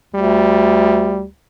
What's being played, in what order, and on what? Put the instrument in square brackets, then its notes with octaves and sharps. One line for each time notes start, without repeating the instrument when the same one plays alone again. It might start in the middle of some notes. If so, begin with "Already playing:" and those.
[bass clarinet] D2 [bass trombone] G3